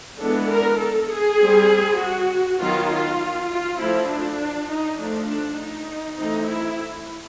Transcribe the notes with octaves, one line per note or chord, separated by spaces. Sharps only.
E3 G#3 B3 D4 A4
A#4
A4
G#4
G3 C4
F#4
D#3 F#3 B3 F4
F4
F4
F3 A3 C4 E4
D4
D#4
F3 A3 D4
D4
D#4
E3 A3 C4 D#4
E4